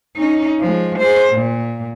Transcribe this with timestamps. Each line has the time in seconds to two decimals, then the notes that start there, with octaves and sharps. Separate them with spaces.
0.16 C#4 D#4
0.60 F3 G#3
0.99 G#4 C5
1.33 A#2